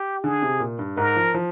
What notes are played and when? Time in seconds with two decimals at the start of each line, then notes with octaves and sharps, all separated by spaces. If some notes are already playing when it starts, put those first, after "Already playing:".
Already playing: G4
0.24 D3 G#4
0.42 C3
0.60 A#2
0.79 G2
0.97 G#2 A#4
1.16 F3
1.34 F3